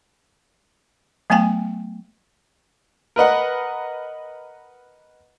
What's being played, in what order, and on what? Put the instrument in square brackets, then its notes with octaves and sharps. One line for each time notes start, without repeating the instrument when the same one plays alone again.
[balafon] F#3 A3 B3 F5 G5 G#5
[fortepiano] A#4 B4 D#5 F#5